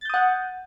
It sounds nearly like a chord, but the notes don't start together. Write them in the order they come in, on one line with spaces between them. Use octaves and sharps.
A6 G6 D#6 F#5